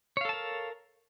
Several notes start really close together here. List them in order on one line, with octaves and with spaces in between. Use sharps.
C#5 F5 A4 A5 A#4